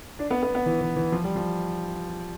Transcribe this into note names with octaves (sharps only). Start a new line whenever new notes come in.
D4
B3
B3
B3
E3
E3
E3
F3
G3
F3